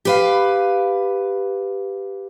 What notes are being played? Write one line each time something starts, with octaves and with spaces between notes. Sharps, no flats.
G4 B4 F5